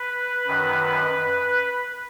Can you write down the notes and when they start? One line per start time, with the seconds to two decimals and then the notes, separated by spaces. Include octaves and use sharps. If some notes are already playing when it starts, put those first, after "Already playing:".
Already playing: B4
0.47 F#2 D#3